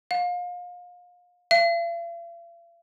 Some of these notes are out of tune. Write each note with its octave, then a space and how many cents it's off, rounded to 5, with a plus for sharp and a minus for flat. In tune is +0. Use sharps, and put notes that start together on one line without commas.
F5 +30
F5 -45